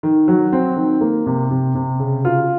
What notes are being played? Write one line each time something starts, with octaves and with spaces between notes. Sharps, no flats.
D#3
F#3
C4
D#3
A#3
C3
C3
C3
C#3
F4